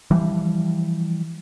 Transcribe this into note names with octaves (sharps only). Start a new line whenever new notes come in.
E3 F3 G3